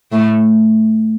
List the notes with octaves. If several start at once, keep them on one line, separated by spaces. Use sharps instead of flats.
A2 A3